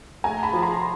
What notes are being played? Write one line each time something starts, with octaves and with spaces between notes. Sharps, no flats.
A3 G#5 A#5
A5 B5
F3
A#5 C6